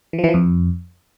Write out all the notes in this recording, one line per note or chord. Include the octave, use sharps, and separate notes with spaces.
E3
F3
E3
F3
F2